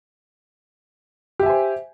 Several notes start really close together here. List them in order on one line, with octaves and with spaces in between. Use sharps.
G4 E5 G#5 C5